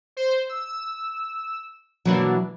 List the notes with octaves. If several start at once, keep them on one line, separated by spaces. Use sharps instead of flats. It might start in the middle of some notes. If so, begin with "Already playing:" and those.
C5
E6
B2 E3 F#3 A#3 D4